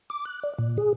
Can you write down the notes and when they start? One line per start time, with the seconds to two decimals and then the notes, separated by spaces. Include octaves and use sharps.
0.10 D6
0.25 F#6
0.43 D5
0.58 A#2
0.78 G#4